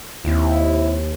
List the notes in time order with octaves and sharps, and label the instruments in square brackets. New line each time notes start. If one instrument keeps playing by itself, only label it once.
[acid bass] D#2 [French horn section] C3 E4